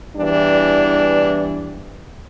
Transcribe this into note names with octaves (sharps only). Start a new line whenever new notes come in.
E2 E3 G3 D4